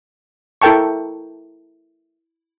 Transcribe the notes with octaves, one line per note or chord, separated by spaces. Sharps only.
E4 A4 A#4 G5 A5 C#6